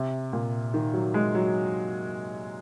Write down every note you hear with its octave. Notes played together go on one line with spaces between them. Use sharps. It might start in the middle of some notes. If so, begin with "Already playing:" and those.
Already playing: C3
A#2
D#3
F#3
G#3
F#3